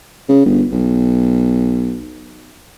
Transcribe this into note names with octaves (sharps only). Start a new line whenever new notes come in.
C#3
G1
B1